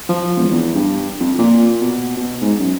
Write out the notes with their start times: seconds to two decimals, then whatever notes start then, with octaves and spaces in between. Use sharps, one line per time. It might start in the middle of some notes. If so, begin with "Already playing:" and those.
0.09 F3
0.37 E1
0.51 E2
0.75 G2
1.20 F2
1.39 A#2
1.81 B2
2.17 B2
2.41 G#2
2.59 F#2